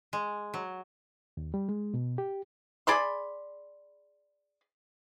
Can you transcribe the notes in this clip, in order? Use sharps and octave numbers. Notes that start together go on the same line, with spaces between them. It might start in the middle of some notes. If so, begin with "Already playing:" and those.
G#3
F#3
D#2
G3
G#3
B2
G4
G#4 D5 B5 C6